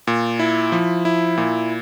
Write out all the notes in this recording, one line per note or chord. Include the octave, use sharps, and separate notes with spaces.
A#2
E4
F3
E4
A#2